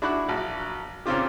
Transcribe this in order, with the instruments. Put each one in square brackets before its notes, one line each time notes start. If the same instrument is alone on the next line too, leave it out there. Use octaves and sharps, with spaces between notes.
[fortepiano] D4 E4 F#4 B5 D6 F#6
A#1 F#3
A#2 C#3 C4 F4 G4